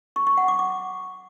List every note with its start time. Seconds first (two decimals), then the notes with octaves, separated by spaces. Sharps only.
0.16 C#6
0.27 C#6
0.37 F#5
0.48 D6
0.59 D6